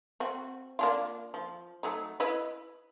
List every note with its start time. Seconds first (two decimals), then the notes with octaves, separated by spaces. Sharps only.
0.20 C4 F#4
0.79 A#3 D4 F4
1.34 F3
1.83 F#3 A3 D#4
2.20 E4 B4 D#5